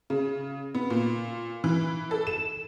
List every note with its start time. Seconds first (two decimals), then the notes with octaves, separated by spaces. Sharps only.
0.10 C#3
0.75 B3
0.90 A#2
1.64 E3
2.11 A4
2.27 E7